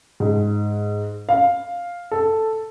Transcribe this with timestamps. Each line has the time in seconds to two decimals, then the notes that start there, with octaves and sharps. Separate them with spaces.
0.20 G#2
1.29 F5
2.11 A4